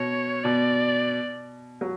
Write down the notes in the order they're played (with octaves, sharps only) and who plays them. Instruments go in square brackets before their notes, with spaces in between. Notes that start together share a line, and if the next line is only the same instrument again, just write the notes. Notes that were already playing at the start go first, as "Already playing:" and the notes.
Already playing: [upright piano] B2 [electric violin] C#5
[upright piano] B2 [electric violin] D5
[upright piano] F#3